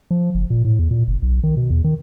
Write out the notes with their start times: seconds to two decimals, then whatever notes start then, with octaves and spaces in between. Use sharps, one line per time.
0.11 F3
0.35 F#1
0.50 A#2
0.65 A2
0.79 E2
0.91 A#2
1.08 F#1
1.22 B1
1.43 D#3
1.57 B2
1.70 E2
1.84 D#3